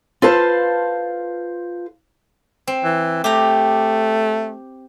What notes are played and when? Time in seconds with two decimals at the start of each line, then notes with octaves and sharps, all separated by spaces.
0.22 F4 A4 B4 C5 F5 A5
2.67 C4
2.84 E3
3.24 A3 G4 A#5